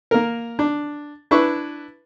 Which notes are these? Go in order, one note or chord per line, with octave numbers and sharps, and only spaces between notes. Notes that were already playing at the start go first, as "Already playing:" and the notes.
A#3 A#4
D4
D4 E4 B4 C#6